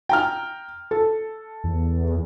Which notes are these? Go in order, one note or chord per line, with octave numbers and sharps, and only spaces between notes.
G5 A#5 F6
A4
E2